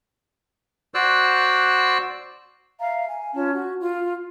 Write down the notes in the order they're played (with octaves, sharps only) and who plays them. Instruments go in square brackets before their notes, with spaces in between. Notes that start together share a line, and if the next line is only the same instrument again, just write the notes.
[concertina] F#4 C5 D5 E6 F#6
[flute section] E5 F5 A#5
G#5
C#4 F4 A5
F#4
F4